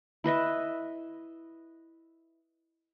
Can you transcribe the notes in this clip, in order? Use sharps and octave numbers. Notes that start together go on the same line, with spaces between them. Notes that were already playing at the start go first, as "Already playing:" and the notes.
E4 B4 D#5 E5